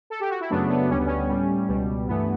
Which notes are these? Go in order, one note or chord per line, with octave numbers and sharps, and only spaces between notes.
A4
G4
F#4
E4
F#2 C#3 F#3 A3 B3 D4
B3
D2 D3 G3 C#4
B3
C#4
A2 G3
C#2 B2 G3
G2 E3 A3 B3